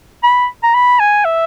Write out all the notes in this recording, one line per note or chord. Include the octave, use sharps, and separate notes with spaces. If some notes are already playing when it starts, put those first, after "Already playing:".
B5
A#5
B5
G#5
E5